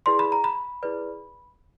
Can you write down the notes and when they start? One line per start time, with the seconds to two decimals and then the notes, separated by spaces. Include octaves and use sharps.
0.06 E4 G#4 B4 D5 C6
0.19 B5
0.32 A#5
0.44 B5
0.83 E4 G#4 B4 D5